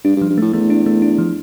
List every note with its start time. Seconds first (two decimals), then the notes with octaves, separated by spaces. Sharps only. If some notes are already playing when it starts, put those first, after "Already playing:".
0.05 G2 D4
0.17 G2
0.21 F3
0.30 G2
0.38 A2 A3
0.53 E2 A3
0.70 D4
0.86 A3
1.02 D4
1.18 F3